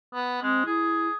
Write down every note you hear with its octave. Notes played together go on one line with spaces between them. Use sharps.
B3
G#3 C4
E4 G#4